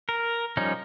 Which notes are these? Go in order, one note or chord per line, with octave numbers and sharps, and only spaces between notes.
A#4
F3 G3 C#4 D#4